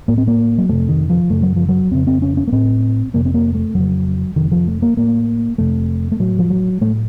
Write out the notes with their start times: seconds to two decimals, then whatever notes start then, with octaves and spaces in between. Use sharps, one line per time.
0.08 A2 A#3
0.18 C4
0.27 A#3
0.58 F#3
0.69 F2 C3 A3
0.89 D#3
1.10 F3
1.30 F#2 C#3 A3
1.43 F#3
1.56 F3
1.69 F#3
1.91 F2 C#3 C4
2.07 C4
2.22 C#4
2.37 C#4
2.47 A#3
2.52 A2 C4
3.14 F2 C3 A#3
3.25 C4
3.34 A#3
3.55 A3
3.74 F2 C#3 F#3
4.36 F2 C3 D#3
4.52 F3
4.67 A3
4.82 A#3
4.97 A2 A#3
5.58 F2 C3 A3
6.12 A3
6.19 A2 F#3
6.39 F3
6.50 F#3
6.81 A2 A3